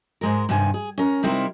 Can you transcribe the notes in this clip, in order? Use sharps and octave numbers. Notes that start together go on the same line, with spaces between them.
G#2 G#3 A#4
G2 C3 D#3 G#5
G#4
C#4 A#4
C3 G3 C4 D#4 E4 A#4